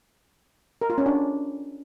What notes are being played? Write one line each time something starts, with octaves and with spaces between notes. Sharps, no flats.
A#4
F4
C#4
D4